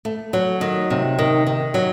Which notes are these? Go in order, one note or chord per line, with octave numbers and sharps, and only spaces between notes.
A3
F#3
D#3
C3
D#3
D#3
F#3